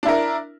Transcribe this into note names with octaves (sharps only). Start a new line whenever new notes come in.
D4 E4 A#4